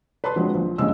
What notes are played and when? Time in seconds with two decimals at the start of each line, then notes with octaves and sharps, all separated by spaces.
0.24 B4 A5 B5 C6
0.36 D3 F3 F#3 G#3 C4
0.54 A#1 F3
0.78 A#1 G2 C#3 G#3 D#5 E6